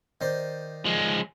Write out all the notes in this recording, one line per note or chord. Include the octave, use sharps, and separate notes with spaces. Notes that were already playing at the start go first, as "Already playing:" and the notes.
D#3 C5 D5
F3 G#3